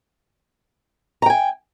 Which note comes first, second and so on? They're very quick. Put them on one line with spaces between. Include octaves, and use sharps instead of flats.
A#5 G5 G#5